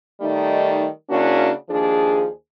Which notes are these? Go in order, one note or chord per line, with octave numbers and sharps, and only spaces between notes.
D#3 G3 A3 D#4
C#3 A#3 C#4 D4 E4 F#4
D#2 F3 D4 G#4